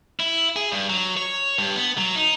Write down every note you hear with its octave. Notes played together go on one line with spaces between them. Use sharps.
E4
G#4
G2
F#3
C#5
G2
B3
F#3
D#4